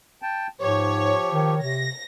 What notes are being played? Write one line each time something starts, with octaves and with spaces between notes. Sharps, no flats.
G5 A5
G#2 F3 G4 C#5
D#3
C3 A#6